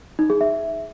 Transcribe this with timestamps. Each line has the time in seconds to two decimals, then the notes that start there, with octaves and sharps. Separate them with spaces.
0.19 D#4
0.30 G#4
0.41 E5